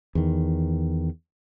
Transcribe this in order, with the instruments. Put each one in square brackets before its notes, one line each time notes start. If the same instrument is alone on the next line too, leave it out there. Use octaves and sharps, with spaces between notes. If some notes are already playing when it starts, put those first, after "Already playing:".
[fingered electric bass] E2 D#3